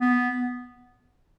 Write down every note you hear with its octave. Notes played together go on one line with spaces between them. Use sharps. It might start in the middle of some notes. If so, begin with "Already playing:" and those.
B3